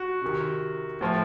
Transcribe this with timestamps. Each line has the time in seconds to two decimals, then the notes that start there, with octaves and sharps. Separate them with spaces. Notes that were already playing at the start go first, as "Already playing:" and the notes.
Already playing: F#4
0.22 C3 D#3
1.01 A2 F3